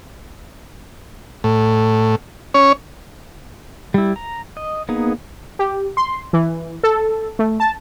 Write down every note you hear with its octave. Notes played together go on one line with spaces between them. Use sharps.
A2
C#4 C#5
G3 E4
A#5
D#5
A#3 B3 D#4 G#4
G4
C6
E3
A4
A3
A5